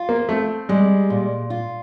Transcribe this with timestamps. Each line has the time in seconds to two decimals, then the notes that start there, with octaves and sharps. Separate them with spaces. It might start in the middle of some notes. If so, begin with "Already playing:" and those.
Already playing: F4
0.09 A#3
0.29 A3 C4
0.69 G3 G#3
1.10 A#2
1.50 F4